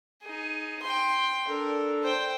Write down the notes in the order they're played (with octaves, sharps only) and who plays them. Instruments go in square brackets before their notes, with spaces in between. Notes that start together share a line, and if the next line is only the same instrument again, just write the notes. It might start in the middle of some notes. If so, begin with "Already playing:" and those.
[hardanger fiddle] D#4 G#4
G5 C6
[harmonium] D4 A4 [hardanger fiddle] A#4
[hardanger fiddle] C5 G5